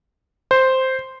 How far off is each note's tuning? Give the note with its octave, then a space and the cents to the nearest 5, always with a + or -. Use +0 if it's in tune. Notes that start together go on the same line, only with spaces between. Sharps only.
C5 +0